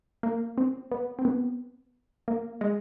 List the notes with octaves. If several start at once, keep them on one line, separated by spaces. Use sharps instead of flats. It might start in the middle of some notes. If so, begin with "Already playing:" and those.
A#3
C4
B3
C4
B3
A#3
G#3